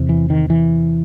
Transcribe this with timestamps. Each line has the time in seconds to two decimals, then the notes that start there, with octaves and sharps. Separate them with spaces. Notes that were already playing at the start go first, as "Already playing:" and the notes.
Already playing: E2 C3
0.09 E3
0.30 D#3
0.50 E3